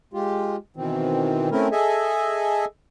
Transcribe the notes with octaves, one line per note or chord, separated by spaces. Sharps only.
G#3 F4 G4
B2 D#3 E3 C4
A3 C4 C#4 E4 A#4
G#4 A4 D#5 E5 G#5